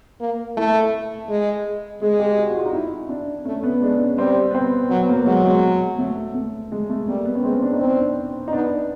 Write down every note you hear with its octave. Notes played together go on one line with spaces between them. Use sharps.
A#3
A3 E4
G#3
G#3 G#4
G4
F#4
F#4
F4
D#4
E4
D4
A3 C#4
B3
G#3 D4
C#4
G3 C4
B3
C4
F#3 B3
A#3
F#3 G#3
G#3
A3
A3
G#3
A3
G3 A#3
B3
C#4
G#3 C4
D4
D#4
C4
D4
D#4
B3 D4